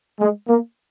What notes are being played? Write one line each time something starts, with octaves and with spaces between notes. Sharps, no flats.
G#3
A#3